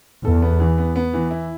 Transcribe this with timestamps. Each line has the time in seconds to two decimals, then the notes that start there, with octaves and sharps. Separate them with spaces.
0.24 E2 A4
0.42 B3
0.60 E3
0.78 B3
0.96 B3
1.14 E3
1.31 E4